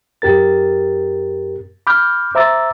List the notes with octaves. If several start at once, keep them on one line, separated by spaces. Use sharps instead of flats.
F#2 G4 A#4 A6
B5 D6 F6 G6
C5 E5 A#5 D6 E6 A6